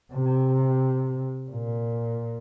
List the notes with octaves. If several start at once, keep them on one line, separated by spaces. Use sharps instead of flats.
C3
A#2